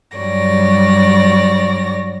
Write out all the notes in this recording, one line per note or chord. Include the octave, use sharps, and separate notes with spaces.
G2 F#3 G3 C#5 D5 A#6